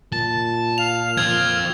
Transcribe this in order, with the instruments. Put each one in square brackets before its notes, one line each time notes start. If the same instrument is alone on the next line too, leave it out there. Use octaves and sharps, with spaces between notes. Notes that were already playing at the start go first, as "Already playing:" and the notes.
[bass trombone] A#2 [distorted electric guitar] A5
[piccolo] F5 [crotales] F7
[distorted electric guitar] C4 F4 [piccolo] F6 [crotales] G#6